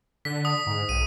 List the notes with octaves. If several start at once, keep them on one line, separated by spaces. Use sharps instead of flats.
D3 B6
D#6
G#2
B1 D#7